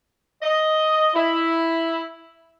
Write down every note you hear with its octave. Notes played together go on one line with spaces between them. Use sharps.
D#5
E4